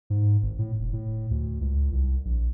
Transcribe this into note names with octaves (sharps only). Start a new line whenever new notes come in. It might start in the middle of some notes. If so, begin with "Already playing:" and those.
G#2
G#1
A2
E1
A2
D2
C#2
C2
A#1